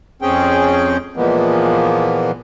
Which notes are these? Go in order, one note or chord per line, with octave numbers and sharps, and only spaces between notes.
F2 C4 C#4 G#4 G5
A#2 E3 F3 G#3 A#3 B3